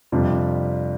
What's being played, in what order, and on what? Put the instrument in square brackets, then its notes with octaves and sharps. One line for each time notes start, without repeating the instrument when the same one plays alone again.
[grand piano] F2 C3 G3 D4 F4